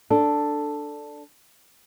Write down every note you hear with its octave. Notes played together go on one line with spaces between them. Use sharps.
D4 A4